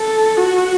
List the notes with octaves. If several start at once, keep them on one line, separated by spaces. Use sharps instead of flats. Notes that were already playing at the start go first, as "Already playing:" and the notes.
Already playing: A4
F#4